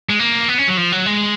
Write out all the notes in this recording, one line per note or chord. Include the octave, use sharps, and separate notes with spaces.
G#3
A#3
B3
C#4
F#3
F3
F#3
G#3